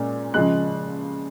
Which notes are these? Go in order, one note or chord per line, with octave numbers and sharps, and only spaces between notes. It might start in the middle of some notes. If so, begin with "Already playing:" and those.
Already playing: A#2 G#3 C#4
C#3 F3 G#3 F#6